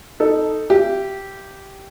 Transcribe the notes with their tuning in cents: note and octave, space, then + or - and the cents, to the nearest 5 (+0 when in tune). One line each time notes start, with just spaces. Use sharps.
D#4 +0 A4 +0
G4 -10 E5 +45